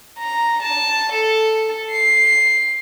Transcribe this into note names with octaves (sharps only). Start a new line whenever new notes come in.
A#5
A5
A4
C7